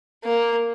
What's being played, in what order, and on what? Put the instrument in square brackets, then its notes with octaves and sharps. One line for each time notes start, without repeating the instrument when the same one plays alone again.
[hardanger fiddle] A#3